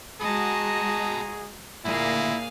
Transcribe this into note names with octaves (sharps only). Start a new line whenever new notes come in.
G#3 B3 F#4 G#4 D#5 A5 A#5
D2 A#2 A#3 E4 G#4 F5